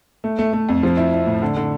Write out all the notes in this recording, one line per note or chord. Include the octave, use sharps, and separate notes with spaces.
A3
A3
A3
F2
F3
E4
E4
A2
D3
D3